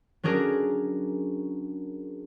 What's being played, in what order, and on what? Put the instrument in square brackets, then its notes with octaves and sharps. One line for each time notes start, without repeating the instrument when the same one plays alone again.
[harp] F#3 C#4 D4 G#4 A#4